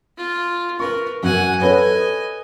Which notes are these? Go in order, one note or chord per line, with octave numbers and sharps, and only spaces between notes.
F4
A#4 B4 C#6
F#2 F#5 G#5
A4 B4 C#5 D#5 G#5